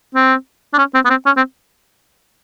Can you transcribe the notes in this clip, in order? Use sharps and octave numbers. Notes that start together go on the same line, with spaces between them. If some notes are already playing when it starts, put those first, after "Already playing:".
C4
D4
C#4
C4
B3
C4
C#4
C4